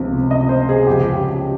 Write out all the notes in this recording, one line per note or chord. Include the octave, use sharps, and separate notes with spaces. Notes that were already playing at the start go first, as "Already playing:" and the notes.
Already playing: C#2 C3 F3
D#5
C5
G#4
C#2 C#3 F3 G4
G4